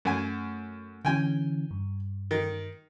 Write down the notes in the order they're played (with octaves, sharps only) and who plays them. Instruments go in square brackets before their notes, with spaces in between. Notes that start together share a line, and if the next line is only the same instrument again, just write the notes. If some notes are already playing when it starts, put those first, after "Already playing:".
[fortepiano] F#2 G#5 [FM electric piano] A3
[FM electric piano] D3 E3 C#4 [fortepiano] G5 G#5
[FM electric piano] G2
[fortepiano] D#3